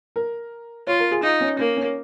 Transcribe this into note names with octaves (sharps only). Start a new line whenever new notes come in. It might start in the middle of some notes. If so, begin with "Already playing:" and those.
A#4
F4 C#5
A#4
G#4
D#4 F4
C#4
A#3 C#4
C#4